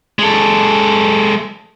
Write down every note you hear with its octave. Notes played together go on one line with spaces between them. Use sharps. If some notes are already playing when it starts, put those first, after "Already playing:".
G#3 A4